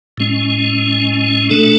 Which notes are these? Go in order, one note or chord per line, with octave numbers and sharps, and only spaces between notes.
A2 G#3 C#4
B2 A3 D4 A4